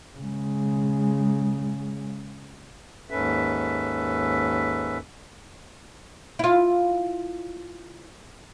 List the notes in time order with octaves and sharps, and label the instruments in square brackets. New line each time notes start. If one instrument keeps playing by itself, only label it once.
[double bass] C#3 G#3
[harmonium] D#2 G#2 C#4 A4 B4 E5
[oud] E4 F4